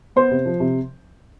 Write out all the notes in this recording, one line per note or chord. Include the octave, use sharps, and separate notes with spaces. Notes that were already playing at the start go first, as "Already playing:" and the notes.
B3 C5
C3
F3
C3